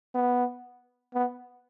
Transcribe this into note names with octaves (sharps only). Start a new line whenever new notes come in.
B3
B3